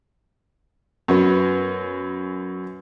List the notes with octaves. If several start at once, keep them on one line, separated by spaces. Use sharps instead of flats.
F#2 F#3 B3